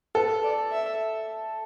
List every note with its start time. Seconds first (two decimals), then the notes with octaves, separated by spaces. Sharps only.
0.15 A4 B4
0.43 D5
0.71 E5